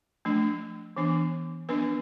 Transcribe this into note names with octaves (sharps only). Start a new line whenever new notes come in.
F3 A3 D4
E3 B3 D4
F3 B3 D4 B4